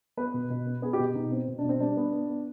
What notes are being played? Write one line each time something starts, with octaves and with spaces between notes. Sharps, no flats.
B3 B4
B2
B2
B3
B3 G#4
G4
B2
B2 D#4
B3 C4
B2
D4
B2 C4
G3 D4
B3
B3
B3